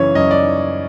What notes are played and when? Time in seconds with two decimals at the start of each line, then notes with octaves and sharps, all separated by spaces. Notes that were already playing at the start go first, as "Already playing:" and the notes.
Already playing: F#2 C#3 E3 C#5
0.15 F#2 D#5
0.31 D5